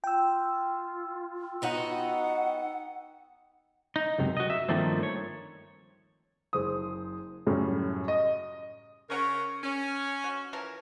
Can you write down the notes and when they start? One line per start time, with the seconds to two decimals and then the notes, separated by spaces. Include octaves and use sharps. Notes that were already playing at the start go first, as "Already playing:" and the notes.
0.04 F4 G5 E6
1.62 B3 D#4 F#4 F#5
3.96 D#4
4.19 C#2 F#2 C3
4.37 F#4 D#5
4.50 E5
4.69 G2 D#3 F3 A3 A#3 C4
5.03 C#5
6.53 F#1 G#3 C5 D#6
7.47 F#2 A2 C#3 G3
8.08 D#5
9.10 C#3 C#4 A#4 C#5 F#5 C#6
9.63 C#4
10.24 F#4
10.53 E3 F3 A#4